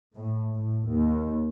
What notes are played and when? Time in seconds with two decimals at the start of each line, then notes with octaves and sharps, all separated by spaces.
0.15 A2
0.54 A2
0.89 D#2